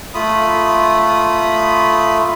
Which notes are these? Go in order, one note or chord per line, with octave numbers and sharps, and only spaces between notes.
A3 F4 B5 D#6